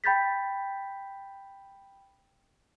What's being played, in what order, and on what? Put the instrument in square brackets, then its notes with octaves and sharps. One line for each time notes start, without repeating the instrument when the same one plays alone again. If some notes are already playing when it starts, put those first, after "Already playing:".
[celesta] G5 B5 G6 A6 B6